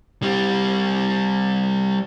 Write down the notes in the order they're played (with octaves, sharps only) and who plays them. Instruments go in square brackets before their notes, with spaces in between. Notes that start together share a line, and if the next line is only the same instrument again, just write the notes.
[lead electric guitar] G3 C4